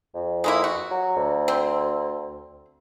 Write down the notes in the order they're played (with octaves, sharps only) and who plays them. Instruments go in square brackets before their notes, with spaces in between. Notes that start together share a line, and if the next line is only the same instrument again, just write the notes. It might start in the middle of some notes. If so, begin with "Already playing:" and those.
[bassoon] F2
[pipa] G#3 A#3 E4
F#4
[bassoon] F#3
D2
[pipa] C4